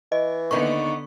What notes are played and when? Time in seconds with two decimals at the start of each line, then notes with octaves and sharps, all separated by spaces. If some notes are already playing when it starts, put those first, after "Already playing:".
0.12 E3 D#5
0.51 D#2 D3 A#3 B3 D#4 C#6